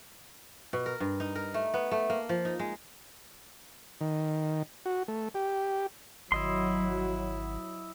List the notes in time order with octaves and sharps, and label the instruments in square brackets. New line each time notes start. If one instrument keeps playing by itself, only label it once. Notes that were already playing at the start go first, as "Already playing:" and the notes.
[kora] B2
A#4
G2
D#4
A#4
A3
B3
A3
A#3
F3
D#4
G#3
[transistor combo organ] D#3
F#4
A3
G4
[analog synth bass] G#1 [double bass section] F#3 [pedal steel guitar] E4 D#5 C6